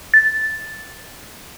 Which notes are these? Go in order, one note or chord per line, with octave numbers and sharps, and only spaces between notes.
A6